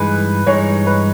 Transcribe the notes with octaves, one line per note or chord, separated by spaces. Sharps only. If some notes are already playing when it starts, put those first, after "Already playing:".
Already playing: G2 E3 G#3 D#4 G#4 B4
G2 E3 G#3 D#4 G#4 C#5
B4